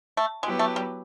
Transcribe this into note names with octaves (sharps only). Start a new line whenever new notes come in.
A3
F#3 G#3 B3 E4 G4 B4
A3
G3